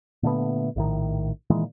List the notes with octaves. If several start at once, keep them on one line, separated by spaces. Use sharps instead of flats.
A#2 D3 A3 B3
A#1 A2 D#3
A#2 D#3 E3 G#3